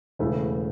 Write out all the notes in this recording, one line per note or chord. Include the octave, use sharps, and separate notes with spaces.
E1 E2 C#3 E3 A3